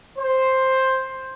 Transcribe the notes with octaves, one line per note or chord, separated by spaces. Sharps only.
C5